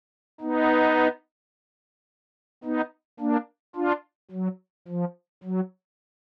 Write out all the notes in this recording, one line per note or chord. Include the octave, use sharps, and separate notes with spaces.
B3 D#4
B3 D#4
A#3 D4
D4 F4
F#3
F3
F#3